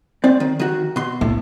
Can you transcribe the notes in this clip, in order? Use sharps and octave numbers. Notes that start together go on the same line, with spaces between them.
C4 D5
D#3
D#3 F#4
B2 C6
A2